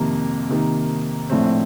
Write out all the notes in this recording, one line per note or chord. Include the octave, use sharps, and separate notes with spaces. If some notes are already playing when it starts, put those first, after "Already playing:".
Already playing: F2 C3 D#3 A#3
C3 D#3 A#3
A#1 A2 A3 C4